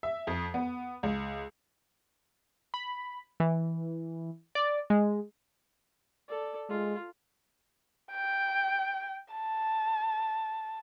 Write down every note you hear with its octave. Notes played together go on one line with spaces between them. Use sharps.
E5
F2
B3
C#2
B5
E3
D5
G#3
A4 D5
G#3 F4
G5
A5